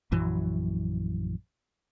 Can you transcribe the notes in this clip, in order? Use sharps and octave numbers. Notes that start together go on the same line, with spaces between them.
A#1 F#2 E3 F#3